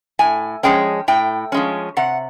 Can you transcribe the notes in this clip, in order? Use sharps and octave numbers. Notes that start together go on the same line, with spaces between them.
A2 G#5
F3 G#3 C#4 G5
A2 G5
F3 G#3 C#4
C3 F#5